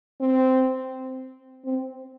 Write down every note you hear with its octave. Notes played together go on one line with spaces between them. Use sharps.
C4
C4